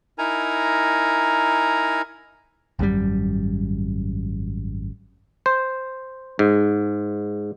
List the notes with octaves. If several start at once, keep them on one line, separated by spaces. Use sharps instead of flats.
D#4 E4 A#4 G#5 A#5
G#1 F#2 A#2 G3
C5
G#2